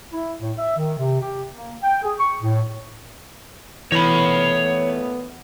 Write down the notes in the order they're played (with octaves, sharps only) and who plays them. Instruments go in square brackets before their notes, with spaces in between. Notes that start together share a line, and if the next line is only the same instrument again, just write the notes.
[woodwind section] E4
A2
E5
D#3
C3
G4
A#3
G5
G#4
C#6
A2
[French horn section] A#2 A3 B3 [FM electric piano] E3 [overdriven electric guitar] C#5 B5